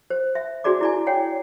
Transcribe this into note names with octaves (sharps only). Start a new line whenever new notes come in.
C5
E5
D4 F#4 G#4 D5 D6
E4 D5 G#5
C#5 F#5 G5